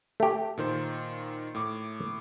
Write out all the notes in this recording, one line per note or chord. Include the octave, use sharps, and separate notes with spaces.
A3 G4
A#2 D#3 C5
A2 D6